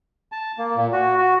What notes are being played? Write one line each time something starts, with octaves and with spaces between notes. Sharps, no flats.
A5
A#3
A#2
F#4
F#4